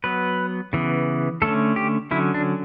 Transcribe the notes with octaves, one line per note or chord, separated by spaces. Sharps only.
F#3 B3 B4
C#3 E3 B3
D3 A3 C#4 A4
G4
D3 F#3 C#4 E4
D4